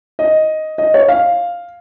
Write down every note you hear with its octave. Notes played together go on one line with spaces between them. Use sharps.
D#5
D#5
C#5
F5